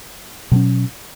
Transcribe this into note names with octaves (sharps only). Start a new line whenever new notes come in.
B2 F#3 C#4